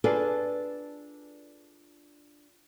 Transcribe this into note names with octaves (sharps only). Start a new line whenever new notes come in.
D4 F4 G#4 A4 B4 D5